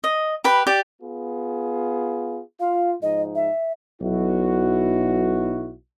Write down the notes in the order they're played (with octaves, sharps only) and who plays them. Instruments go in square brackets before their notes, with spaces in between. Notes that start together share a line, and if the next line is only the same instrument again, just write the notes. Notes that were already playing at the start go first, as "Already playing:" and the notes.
[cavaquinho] D#5
G4 B4 B5
G4 D5
[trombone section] B3 F4 G#4
[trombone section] F4 [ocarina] F5
[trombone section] G#2 F3 D#4 [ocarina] D#5
[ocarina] E5
[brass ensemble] B1 E4 F#4